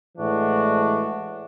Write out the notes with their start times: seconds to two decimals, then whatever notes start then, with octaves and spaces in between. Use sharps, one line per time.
0.17 A2 E3 G#3 D4 F#4